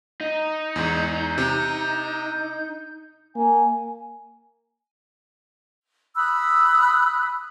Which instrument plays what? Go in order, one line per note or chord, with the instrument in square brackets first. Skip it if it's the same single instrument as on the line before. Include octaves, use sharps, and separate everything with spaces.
[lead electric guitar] D#4
[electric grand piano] E2 G#2 [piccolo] G6
[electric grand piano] C3
[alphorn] A#3 [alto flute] G#5
[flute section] B5 D#6 E6 F#6